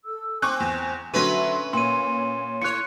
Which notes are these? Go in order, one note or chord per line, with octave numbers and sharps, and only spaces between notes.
A4 E6
C4 G#5 C#6 D6 F#6
E2
D3 F#3 C#4 B4 E5 C6
A#2 C#5 C6 D#7
A2 C#5 F#6 C#7